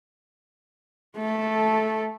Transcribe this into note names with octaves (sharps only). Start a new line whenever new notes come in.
A3 A4